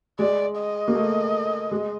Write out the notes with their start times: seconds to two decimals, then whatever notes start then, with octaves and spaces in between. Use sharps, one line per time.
0.19 G#3 D5
0.58 D#5
0.88 A#3
0.95 A3
1.71 G#3